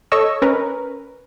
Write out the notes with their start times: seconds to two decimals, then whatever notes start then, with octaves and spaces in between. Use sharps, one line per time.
0.12 A4 C#5 D#5 C#6 E6
0.42 C#4 A#4 B4